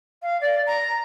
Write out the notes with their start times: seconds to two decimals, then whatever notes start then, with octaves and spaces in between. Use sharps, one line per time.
0.22 F5
0.41 D5
0.66 A#5